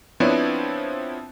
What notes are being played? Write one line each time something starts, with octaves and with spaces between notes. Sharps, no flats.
F3 B3 C4 D4 E4 C#5